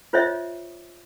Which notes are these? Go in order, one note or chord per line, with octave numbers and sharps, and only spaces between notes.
F4 C5 C#5 D#5 E5